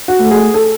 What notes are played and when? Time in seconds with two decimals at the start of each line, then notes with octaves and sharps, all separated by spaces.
0.08 F#4
0.20 A3
0.31 G#4
0.54 A4